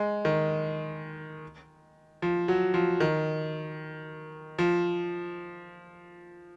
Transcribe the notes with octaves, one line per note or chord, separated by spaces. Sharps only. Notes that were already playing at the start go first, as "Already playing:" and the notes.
Already playing: G#3
D#3
F3
F#3
F3
D#3
F3